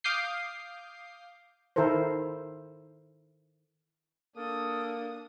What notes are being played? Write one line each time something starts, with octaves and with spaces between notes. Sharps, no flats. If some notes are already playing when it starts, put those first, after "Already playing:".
F5 D6 D#6 G6 C7
D#3 E4 A4 A#4 C5
A#3 D4 A4 D#6